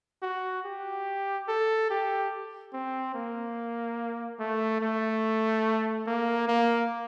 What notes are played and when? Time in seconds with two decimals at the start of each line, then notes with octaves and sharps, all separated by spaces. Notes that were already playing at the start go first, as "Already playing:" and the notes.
0.23 F#4
0.65 G4
1.49 A4
1.91 G4
2.73 C4
3.15 A#3
4.40 A3
4.81 A3
6.07 A#3
6.48 A#3